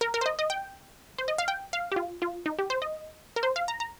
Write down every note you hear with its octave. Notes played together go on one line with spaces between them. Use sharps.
A#4
A#4
C5
D#5
D#5
G5
C5
D#5
F5
G5
F5
G4
F4
F4
D#4
G4
C5
D#5
A#4
C5
F5
A#5
A#5